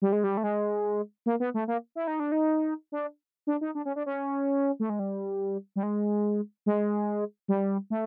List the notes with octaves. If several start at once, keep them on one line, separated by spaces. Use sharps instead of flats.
G3
G#3
G3
A3
G#3
A#3
B3
A3
A#3
E4
D#4
D4
D#4
D4
D4
D#4
D4
C#4
D4
C#4
A3
G#3
G3
G3
G#3
G#3
G3
A3